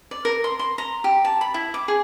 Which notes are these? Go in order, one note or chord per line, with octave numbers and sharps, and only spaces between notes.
D5
A#4
C6
C6
A#5
G4
A5
B5
E4
D6
G#4